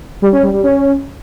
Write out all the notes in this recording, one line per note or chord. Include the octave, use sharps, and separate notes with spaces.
G3
C#4
G3
G3
C#4